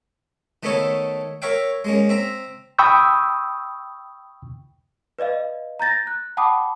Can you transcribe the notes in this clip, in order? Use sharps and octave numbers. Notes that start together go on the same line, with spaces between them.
D#3 A3 B3 D#4 A4 C#5
A#4 C#5 E5 F5 G5
G#3 A#3 C#4
C4 E5 A#5
G5 B5 C#6 D#6 E6 G6
B4 D5 D#5 F5
A#5 G6 A6 A#6
F#6
F#5 G5 A5 B5 D6 D#6